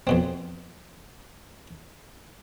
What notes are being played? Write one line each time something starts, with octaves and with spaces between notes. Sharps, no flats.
F2 B2 C4